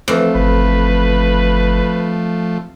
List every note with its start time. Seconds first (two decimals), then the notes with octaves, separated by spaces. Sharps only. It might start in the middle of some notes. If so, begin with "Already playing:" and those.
0.08 F2 E3 F3 A3
0.35 G1 B4